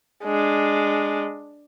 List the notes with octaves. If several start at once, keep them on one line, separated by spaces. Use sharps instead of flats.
G#3 D4